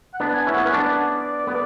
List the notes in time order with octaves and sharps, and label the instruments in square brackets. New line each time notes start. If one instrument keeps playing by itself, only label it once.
[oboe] F#5
[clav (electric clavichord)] B3 D4
[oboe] G#5
[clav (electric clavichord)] C#4 E4
[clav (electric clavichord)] B3 [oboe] F#5
[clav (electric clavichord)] C#4
[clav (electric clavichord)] B3 D4 [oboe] D5
[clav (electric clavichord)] B3